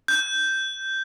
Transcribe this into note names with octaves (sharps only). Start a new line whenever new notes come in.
G6